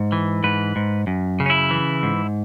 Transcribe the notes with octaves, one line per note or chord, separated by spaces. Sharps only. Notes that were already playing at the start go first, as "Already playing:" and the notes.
Already playing: G#2
E3
G#2 B4
G#2
F#2
C#3
C#4
E4
E3
G#2